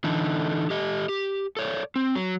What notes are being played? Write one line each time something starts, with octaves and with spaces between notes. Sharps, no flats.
D3 E3 D#4 A4
G4 A4 D#5
G4
A4 C#5 D5
C4
F#3